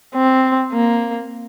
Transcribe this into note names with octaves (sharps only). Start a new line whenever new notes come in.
C4
A#3